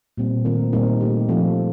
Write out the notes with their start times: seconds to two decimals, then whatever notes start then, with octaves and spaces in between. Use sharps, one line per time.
0.17 A#2 G3 C4
0.45 D#3 A3 C4 F4 A#4
0.73 A#2 G3 C4 D#4 A#4
1.01 A3 D#4 G4
1.29 F3 C4 F4 A4